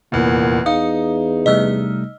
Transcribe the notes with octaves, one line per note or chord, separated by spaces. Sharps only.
F1 E2 A#2
E2 D#4 F5 D#6
C3 G3 A3 D#5 E6 F6